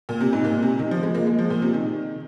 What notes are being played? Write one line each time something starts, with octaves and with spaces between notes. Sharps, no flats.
A#2
C3
G#2
A#2
C3
D#3
F3
G#3
A#3
G#3
F3
A#2
C3
D#3